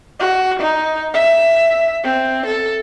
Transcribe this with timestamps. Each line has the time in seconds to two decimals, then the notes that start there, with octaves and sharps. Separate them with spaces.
0.20 F#4
0.60 D#4
1.14 E5
2.04 C4
2.47 A4